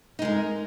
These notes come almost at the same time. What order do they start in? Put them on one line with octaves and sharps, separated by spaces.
D#4 G#3 A#4